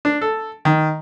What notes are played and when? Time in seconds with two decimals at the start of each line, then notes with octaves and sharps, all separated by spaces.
0.05 D4
0.21 A4
0.65 D#3